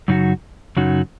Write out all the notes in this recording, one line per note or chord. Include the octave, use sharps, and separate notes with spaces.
F#2 C#3 F#3 D#4 F#4
F#2 C#3 F#3 D#4 F#4